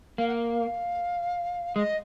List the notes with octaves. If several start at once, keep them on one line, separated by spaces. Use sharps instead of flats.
A#3 F5
F#5
F5
G#3 D#5